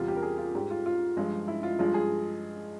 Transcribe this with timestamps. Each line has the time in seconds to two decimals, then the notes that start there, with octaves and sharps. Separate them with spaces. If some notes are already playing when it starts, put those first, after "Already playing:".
Already playing: E2 C3 G3 F4
0.08 G4
0.16 A#4
0.23 G#4
0.38 F4
0.55 G#2 G3 G4
0.70 F4
0.86 F4
1.17 G2 F3 G#3
1.48 E4
1.63 F4
1.79 G2 F3 G#3 F4
1.94 G#4